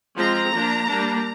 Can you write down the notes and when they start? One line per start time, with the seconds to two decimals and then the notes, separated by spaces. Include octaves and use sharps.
0.16 F3 G#3 C4 A#5
0.52 F3 A#3 D4
0.87 G3 A#3 D4